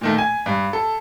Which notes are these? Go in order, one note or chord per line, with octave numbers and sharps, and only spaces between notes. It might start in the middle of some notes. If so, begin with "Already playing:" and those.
A#2 D#3 A3
G#5
G2
A4